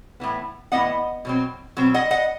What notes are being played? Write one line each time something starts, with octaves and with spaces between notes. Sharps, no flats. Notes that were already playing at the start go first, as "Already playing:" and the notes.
A2 E3 B3
A2 E3 B3 D#5 F#5
B2 F#3 C4
B2 F#3 C4
D#5 F#5
D#5 F#5